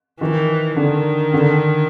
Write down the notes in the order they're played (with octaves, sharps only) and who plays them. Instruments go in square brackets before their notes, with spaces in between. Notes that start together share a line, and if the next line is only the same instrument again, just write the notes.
[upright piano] D#3 [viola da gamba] E3
[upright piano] D3 [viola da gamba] D#3
[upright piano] D3